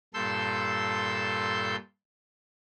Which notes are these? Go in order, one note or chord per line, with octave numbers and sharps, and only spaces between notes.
G2 A#2 A4 C6 E6 G6